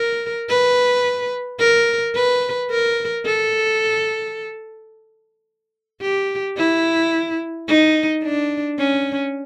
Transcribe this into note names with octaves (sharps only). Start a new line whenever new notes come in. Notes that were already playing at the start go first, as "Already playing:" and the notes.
Already playing: A#4
B4
A#4
B4
A#4
A4
G4
E4
D#4
D4
C#4